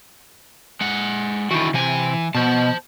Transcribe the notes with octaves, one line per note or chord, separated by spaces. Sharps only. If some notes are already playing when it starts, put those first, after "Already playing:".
G#3 F#5
D#3 E3 E4 F#4
C3 E3 G#5
B2 C5 A5